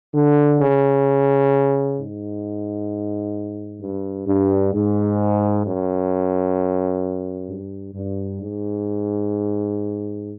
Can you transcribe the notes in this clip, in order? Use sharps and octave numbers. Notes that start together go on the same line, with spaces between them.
D3
C#3
G#2
G2
G2
G#2
F#2
G2
G2
G#2